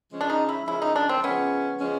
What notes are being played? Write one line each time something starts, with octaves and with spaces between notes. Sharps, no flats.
C#3 F3 G#3 C#4
D4
D#4
E4
C#3 F3 G#3 C#4 E4
D#4
D4
C4
C#3 F3 G#3 B3 C#4
C#3 F3 G#3 C#4